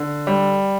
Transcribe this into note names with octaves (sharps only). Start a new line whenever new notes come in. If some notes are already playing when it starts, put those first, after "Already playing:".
Already playing: D3
G3